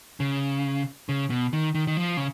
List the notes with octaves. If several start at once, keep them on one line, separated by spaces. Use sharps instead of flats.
C#3
C#3
B2
D#3
D#3
D#3
F3
C#3